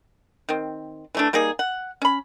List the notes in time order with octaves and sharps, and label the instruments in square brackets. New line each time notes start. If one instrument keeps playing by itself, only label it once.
[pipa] D#3 C4
E3 A3 D4
G3 A#3 D#4 G#4
F#5
C#4 B5